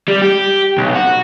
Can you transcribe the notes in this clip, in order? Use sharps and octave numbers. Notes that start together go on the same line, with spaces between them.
G3
G4
B1
F#4